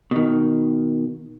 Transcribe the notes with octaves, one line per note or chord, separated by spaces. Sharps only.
B2 D#3